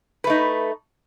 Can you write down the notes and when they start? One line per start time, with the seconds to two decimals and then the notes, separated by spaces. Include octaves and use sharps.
0.24 B4
0.27 A3
0.30 D#4